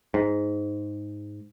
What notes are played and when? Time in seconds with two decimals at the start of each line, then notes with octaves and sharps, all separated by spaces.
0.14 G#2